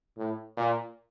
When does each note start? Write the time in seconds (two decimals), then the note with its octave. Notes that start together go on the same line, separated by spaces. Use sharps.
0.17 A2
0.57 A#2